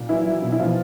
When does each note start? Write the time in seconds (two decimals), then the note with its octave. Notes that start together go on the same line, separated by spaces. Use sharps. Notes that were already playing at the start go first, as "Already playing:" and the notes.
Already playing: A#2
0.09 E3 F#3 E4
0.26 F#3
0.42 B2
0.52 E4
0.60 B2 F3 F4